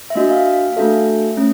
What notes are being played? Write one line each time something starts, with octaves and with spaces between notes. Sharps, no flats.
E5
A#3 D4 F#4 D#5
F5
F5
F5
A3 D4 F#4 A4 E5
A3 C#4